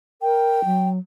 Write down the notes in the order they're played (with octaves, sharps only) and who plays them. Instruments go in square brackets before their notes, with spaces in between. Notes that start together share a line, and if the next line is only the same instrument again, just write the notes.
[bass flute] A#4 [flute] G5
[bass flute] F#3